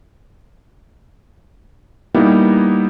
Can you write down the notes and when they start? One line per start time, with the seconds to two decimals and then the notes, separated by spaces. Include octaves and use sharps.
2.15 G3 A#3 B3 D#4 E4